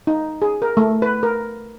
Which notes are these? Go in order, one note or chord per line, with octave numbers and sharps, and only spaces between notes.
D#4
G#4
A#4
A3
B4
A#4